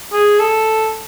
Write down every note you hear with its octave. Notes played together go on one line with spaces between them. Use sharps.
G#4
A4